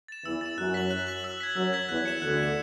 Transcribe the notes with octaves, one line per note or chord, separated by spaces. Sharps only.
A6 E7
E2 E3 E6
A6 E7
F#2 F#3 F#6
B6 F#7
F#6
B6 F#7
E6
G#6 B6
F#2 F#3 E6
G#6 B6
E2 E3 F#6
C#7 E7
D2 D3 F#6
C#7 E7